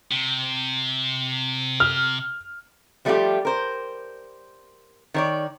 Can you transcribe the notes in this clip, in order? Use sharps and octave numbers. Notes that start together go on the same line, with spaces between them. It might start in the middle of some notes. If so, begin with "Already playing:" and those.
C3
F6
F3 G3 A3 D#4 F4 G4
A#4 C5
D#3 C#5 D5